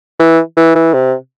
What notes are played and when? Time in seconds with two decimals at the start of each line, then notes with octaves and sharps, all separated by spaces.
0.19 E3
0.57 E3
0.75 E3
0.94 C3